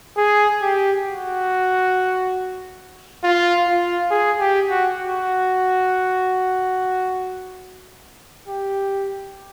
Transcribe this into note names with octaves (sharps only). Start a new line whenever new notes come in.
G#4
G4
F#4
F4
F4
G#4
G4
F#4
F#4
G4